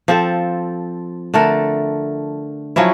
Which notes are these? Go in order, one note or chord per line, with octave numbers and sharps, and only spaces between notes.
F3 C4 A4
D3 A3 A4 A#4
F3 F#3 C#4 E4